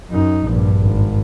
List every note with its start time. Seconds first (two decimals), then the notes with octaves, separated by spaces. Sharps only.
0.11 F#2 D#4
0.47 A#1 G2
0.81 G#1